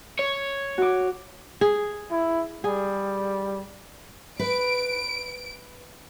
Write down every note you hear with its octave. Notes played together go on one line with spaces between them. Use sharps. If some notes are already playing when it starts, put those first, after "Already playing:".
C#5
F#4 D6
G#4
E4
G3 G#4
B4 D7